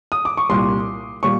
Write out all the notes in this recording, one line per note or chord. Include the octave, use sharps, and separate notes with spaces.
D#6
D6
C#6
C2 A#2 G3 C6
A#2 G3 C#6